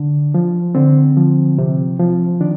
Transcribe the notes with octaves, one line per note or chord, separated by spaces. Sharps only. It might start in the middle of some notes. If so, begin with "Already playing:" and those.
Already playing: D3 D4
F3
D3 C4
F3
C3
F3
D#3 D4